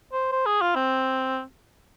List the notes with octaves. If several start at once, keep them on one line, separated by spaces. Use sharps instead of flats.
C5
C5
G#4
F4
C4